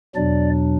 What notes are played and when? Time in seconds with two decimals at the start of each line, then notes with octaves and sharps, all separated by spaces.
0.15 E2 B2 F#3 D4 D5